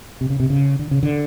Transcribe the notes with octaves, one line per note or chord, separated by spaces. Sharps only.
C3
C#3
C3
C#3
D3
C#3
D3